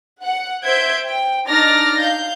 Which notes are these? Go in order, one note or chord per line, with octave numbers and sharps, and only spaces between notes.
F#5 C#7
C5 E5 G6 G#6 D7
G5
D4 D#4 D6 F6 A6 A#6
F5 G6